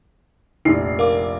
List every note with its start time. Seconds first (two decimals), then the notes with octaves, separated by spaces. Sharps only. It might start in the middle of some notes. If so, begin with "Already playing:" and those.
0.65 F1 A#1 C7
0.99 A#4 F5 D6